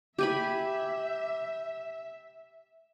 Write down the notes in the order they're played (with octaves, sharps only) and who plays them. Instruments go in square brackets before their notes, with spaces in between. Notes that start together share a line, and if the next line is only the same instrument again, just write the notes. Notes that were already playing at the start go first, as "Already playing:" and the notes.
[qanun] G4 G#5 B5 [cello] E5